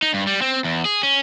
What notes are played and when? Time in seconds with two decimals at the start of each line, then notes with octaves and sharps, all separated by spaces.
0.02 D#4
0.14 G2
0.27 G3
0.42 C4
0.64 E2
0.85 G#4
1.03 C#4